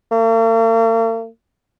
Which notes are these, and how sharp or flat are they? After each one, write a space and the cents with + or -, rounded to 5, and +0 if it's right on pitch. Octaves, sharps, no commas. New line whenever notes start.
A#3 -45